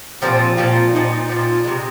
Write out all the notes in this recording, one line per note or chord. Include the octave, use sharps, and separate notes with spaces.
A#2 F3 C4 G4
A#2 F3 C4 F4
A#2 F3 C4 D#4
A#2 F3 C4
C3 D#3 G#3